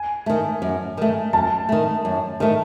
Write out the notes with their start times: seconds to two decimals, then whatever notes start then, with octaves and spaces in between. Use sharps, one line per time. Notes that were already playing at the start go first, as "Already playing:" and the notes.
Already playing: G#5
0.26 D#3 A3
0.62 F#2
0.97 D#3 A3
1.33 F#2 A5
1.69 D#3 A3
2.05 F#2
2.40 D#3 A3